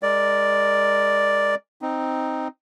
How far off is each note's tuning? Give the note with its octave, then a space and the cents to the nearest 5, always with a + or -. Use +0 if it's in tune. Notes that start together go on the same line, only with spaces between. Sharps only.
G#3 -15 A#4 -10 D5 +0
C4 +0 D#4 +0